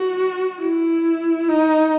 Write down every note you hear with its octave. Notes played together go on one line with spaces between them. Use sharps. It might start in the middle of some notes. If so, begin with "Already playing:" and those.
Already playing: F#4
E4
D#4